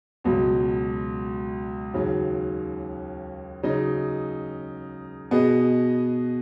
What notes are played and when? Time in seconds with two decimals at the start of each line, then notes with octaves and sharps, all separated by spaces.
0.24 C#2 B2 F#3
1.94 D#2 C#3 F#3
3.63 C#3 F#3 D#4
5.31 B2 B3 G#4 D#5